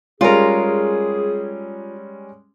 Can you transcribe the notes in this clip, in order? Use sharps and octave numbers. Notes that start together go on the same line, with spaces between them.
G3 G#3 C#4 F4 G#4 A#4